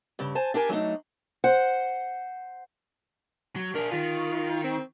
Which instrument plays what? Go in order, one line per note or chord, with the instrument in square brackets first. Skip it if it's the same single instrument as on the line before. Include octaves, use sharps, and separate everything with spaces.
[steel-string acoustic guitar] G2 C#3
C5 G#5 A5
D4 G4 A#4 G#5
F#3 A3 D4 D#4
C5 F#5
[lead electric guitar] F#3
[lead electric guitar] D4 G#4 [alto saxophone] A#4
[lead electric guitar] D#3 [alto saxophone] F4
[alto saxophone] C4